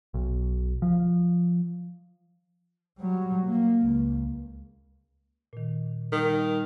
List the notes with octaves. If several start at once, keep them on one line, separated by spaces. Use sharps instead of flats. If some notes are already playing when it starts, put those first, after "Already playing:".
B1
F3
F#3 G3
A#3
C#2
A#2 D#3
D#3 G3
A#4